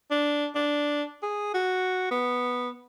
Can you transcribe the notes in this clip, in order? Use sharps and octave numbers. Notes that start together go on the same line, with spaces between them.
D4
D4
G#4
F#4
B3